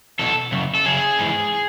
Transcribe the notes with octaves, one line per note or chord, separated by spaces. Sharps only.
E2 B2 A4
F#2 C#3
A4
F#2 C#3 G#4
G#2 E3